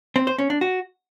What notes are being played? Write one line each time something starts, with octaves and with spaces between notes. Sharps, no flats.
C4
C5
C#4
D4
F#4